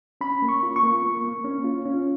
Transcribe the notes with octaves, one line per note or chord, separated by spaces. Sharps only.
C#4 B5
A#3
C#6
F4
C#6
A#3
A#3
A#3
C#4
F4
C#4